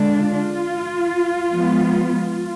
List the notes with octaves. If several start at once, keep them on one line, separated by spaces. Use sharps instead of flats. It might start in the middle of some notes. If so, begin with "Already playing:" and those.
Already playing: D3 G#3 D4
F4
F3 G#3 B3